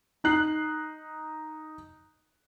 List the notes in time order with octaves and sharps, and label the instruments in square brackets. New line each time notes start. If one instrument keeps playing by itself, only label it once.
[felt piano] D#4 F#6 C7